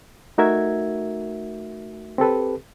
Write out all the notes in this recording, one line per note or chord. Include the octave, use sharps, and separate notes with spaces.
A3 D#4 F#4 A#4 E5 G#6
C4 G4 A4 B4